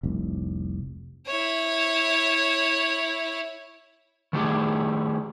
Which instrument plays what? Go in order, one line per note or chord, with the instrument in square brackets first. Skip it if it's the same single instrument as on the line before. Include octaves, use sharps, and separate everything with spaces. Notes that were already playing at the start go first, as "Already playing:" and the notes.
[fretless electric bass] F1 C2
[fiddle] E4 C#5
[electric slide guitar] D#3 A3 G4 G#4